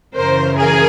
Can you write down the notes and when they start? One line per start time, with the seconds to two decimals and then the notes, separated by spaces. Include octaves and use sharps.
0.15 F#2 C#3 E3 A#4 C5
0.56 G#4 A#4